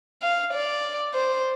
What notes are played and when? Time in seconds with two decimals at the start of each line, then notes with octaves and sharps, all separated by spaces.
0.22 F5
0.53 D5
1.15 C5